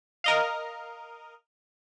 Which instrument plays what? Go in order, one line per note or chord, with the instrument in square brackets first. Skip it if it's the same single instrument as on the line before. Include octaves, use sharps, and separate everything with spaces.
[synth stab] A#4 D#5 F5